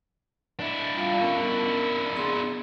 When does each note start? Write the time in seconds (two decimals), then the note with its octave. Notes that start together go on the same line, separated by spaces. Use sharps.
0.60 D4 E4
0.96 G3 F4 F5
1.20 B3 C#4 A#4
2.14 B3 G#4 C6